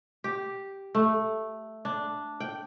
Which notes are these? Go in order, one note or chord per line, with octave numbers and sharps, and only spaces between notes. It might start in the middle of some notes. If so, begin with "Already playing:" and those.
G4
A3
D4
G5